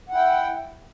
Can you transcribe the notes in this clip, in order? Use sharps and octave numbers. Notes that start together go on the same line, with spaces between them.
E4 F#5 G5